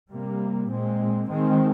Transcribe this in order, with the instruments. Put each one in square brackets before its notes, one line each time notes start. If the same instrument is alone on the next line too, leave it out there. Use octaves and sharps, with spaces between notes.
[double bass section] C3 G3 A#3
A#2 G#3 C4
D#3 G#3 C4